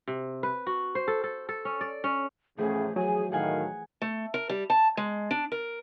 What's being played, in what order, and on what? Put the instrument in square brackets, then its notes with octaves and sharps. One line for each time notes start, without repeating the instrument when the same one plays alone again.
[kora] C3
B4
F#4
C5
A4
A4
A4
C#4
D5
C#4
[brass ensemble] A2 C#3 C#4 [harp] E3 F3 A3 [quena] G#4
[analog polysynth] F#3 [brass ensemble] G#4 [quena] G#5
[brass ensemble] A2 D#3 [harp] G#4 F#5 G#5 [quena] F5
[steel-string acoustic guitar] A3
A#4
G3
A5
G#3
D4
A#4